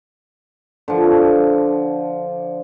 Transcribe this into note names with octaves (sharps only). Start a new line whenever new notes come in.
D3 F3